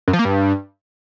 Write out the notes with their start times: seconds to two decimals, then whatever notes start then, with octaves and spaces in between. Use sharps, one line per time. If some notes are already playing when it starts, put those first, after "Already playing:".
0.08 F#2
0.13 F3
0.19 A#3
0.25 G2